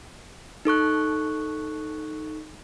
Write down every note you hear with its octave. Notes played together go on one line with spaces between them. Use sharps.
D#4 A4 C#6 F#6